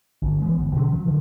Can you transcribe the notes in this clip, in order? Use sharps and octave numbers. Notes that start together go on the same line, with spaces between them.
G1
E3 G#3 B3
G1 E2
B2 D3 F#3 C#4
F3 F#3
D3 D#3 F3